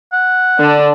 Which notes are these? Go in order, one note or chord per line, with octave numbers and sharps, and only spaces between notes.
F#5
D3 D4